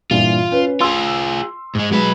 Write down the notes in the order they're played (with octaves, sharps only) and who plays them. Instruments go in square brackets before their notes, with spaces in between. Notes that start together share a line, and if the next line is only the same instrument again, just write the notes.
[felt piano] G2 A#2 E3 [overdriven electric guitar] F4
[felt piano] C#4 B4
[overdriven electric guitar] F4 G#4 [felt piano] C6 E6
[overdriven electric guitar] G#2 G#3
[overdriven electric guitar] F#3 B4 [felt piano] G#3